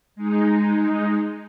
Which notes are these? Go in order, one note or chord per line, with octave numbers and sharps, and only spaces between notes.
G#3 D#4